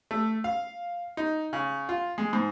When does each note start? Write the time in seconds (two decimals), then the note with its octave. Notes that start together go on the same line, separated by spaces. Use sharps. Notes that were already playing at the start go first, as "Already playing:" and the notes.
0.11 A3
0.44 F5
1.17 D#4
1.53 C#3
1.89 F4
2.18 G#3
2.33 G#2